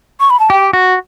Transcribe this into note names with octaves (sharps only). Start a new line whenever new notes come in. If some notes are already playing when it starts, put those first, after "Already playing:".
C#6
B5
A5
G4 G5
F#4